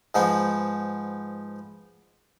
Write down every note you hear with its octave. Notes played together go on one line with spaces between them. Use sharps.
G#2 F3 B3 D#4